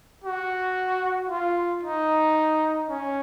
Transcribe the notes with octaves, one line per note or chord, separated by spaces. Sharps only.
F#4
F4
D#4
C#4